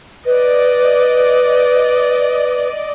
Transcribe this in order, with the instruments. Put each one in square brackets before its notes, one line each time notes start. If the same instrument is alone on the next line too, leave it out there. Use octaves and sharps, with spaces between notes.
[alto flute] B4 [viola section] D5 D#5